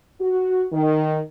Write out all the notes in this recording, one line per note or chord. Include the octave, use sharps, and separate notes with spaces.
F#4
D#3